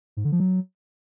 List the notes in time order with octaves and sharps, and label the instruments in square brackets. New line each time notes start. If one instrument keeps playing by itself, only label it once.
[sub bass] G#2
D3
F3
F#3